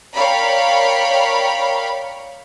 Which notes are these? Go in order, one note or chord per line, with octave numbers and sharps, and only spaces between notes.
A#4 C#5 D5 F5 G5 B5